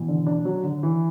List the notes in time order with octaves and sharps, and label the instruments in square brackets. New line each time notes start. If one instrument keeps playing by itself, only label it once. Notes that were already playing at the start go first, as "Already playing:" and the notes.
Already playing: [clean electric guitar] B2 E3
[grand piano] D3
D4
F#3
D3
E3